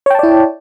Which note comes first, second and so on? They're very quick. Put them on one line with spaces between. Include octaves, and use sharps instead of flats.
C#5 G5 A5 D5 E4